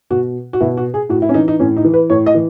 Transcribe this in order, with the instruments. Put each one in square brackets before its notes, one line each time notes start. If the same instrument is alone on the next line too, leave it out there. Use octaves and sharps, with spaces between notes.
[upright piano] B2 F#4
F#4
B2 E4
F#4
G#4
A2 F#4
E4
C#4
E3 D#4
D#4
A2 C#4
D#4
E3
B4
A2 C#5
D#5
E3